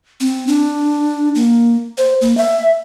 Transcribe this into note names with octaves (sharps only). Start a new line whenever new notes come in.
C4
D4
A#3
C5
A#3
E5